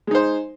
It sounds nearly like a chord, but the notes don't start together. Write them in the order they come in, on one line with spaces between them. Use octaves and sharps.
G#3 D#4 C5